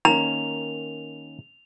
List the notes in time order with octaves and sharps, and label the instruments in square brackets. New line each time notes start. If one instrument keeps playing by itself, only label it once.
[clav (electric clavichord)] D#3 A#3 C#4 [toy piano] A#5 [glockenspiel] F7